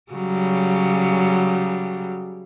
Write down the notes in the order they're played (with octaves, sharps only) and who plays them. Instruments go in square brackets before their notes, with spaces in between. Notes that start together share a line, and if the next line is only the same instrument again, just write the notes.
[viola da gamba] C#3 F#3 G3